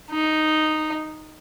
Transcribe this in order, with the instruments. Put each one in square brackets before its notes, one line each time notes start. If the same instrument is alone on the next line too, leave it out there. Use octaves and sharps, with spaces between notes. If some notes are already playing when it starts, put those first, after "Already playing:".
[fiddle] D#4